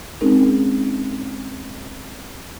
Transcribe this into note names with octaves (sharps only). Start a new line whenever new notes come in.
G#3 C4 C#4 D#4 G#4 A#4